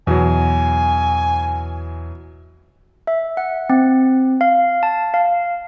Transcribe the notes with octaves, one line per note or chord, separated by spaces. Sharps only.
E2 B2 E3 F#3 G#5
E5
F#5
C4
F5
A5
F5